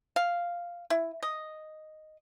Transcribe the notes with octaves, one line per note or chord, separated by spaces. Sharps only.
F5
E4
D#5